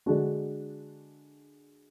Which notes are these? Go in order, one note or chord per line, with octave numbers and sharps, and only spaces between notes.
D3 G#3 D4 F#4